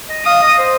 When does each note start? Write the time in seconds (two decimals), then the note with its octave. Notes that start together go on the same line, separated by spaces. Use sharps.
0.10 D#5
0.25 F5 D#6
0.42 D#5
0.58 C5